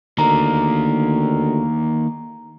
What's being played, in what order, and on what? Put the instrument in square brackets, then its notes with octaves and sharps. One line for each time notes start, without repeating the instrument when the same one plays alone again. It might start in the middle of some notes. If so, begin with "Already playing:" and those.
[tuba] D2 [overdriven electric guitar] D#3 A#3 [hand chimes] A#5